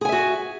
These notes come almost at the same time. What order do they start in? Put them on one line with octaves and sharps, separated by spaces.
G#4 G#5 E5 F#4